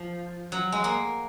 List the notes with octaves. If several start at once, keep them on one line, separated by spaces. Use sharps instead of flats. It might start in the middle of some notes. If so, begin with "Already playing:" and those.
Already playing: F3
F#3
G#3
A#3